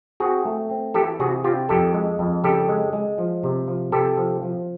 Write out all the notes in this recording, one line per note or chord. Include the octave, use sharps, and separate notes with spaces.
C4 F#4 G#4
A3
C4
E3 G4 A4
C3 F#4 G#4
C4 F4 G4
F2 G4 A4
G#3
F2
C#3 G4 A4
G#3
G#3
F3
C3
F3
C3 G4 A4
F3
F3